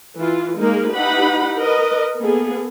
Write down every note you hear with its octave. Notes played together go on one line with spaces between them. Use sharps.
E3 F4
G#3 A#3 D#4 A#4
D#4 E4 G4 B4 F#5 B5
A#4 B4 D#5
A#3 B3 G#4 A4